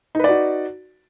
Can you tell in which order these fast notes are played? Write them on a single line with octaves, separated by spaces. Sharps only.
D#4 B4 D5 F#4